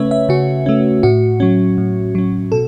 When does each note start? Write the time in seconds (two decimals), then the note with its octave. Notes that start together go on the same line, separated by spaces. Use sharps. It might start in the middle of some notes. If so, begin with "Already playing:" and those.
Already playing: C#3 A3 C#4 B4 C#5 E5
0.11 E5
0.29 C#3 F#4
0.66 A3 C#4
1.03 A2 F#4
1.40 F#3 C#4
1.78 A2
2.15 F#3 C#4
2.52 B2 A4